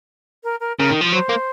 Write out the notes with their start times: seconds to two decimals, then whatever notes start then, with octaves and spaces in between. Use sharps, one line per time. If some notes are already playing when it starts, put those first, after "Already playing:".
0.44 A#4
0.60 A#4
0.78 C#3 A#4
0.90 D#3
1.01 F3
1.13 F#3 C5
1.29 A#3